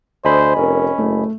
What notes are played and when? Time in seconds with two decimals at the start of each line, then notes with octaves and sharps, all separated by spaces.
0.25 D2 C5 D#5 G#5 B5
0.56 F1 C#4 A#4
0.98 F#1 A3